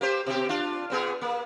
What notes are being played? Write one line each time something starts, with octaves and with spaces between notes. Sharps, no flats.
A#3 G4 C5
B2 G4
D4 F4
A#2 B3 G#4
A#3